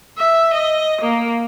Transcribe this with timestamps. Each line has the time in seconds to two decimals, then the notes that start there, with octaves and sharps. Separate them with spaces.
0.18 E5
0.54 D#5
1.01 A#3